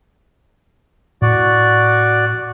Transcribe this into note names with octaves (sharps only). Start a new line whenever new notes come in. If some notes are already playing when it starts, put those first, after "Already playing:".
A2 F#4 D5